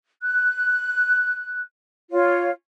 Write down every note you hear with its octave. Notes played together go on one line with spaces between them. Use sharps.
F#6
F4 C#5